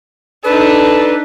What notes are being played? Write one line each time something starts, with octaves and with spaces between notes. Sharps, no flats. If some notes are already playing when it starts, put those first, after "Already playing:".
D4 D#4 A4 B4